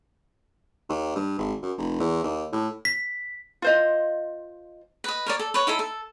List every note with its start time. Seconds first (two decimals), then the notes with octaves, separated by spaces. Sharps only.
0.89 D#2
1.16 G2
1.39 G#1
1.62 F#2
1.78 F1
2.00 E2
2.24 D#2
2.52 A2
2.85 B6
3.62 F4 C5 D#5
5.04 B4 D#5
5.26 A#4 C#5 D5
5.39 A4
5.54 B4 C#5
5.67 D#4 E4 A4 E5
5.79 A4